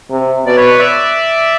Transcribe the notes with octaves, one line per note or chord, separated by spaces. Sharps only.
C3
B2 D5
B4 C#5
D5 E5